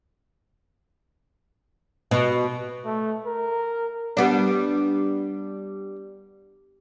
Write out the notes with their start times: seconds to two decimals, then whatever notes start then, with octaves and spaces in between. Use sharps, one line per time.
2.11 B2
2.85 A3
3.26 A#4
4.17 G3 B3 D4